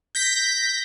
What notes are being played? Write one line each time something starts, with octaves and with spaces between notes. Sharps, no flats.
G6 A#6 B6